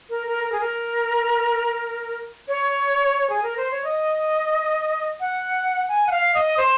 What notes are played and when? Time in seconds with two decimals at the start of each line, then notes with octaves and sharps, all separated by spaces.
0.10 A#4
0.27 A#4
0.44 A#4
0.52 G#4
0.60 A#4
2.48 C#5
3.30 G#4
3.43 A#4
3.57 C5
3.71 C#5
3.84 D#5
5.20 F#5
5.89 G#5
6.07 F#5
6.11 F5
6.34 D#5
6.57 C5